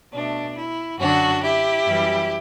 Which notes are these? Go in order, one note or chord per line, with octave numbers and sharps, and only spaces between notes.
B2 A3 D4
E4
F#2 D3 F#3 D4 F#4
E4 G4
F#2 E3 G3